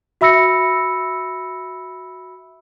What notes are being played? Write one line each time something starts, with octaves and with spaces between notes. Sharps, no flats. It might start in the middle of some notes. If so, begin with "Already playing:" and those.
F#4 E5 B5 E6 A#6 C#7